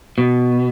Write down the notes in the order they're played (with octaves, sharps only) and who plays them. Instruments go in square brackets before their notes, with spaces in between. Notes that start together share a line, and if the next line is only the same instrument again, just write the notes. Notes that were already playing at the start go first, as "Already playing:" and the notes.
[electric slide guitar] B2